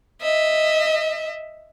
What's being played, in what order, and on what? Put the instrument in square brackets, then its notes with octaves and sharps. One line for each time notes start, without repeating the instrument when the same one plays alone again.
[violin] D#5 E5